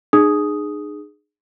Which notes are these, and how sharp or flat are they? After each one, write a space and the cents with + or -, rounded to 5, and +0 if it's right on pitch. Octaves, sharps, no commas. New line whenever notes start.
D#4 -45 G#4 +0 D#6 +0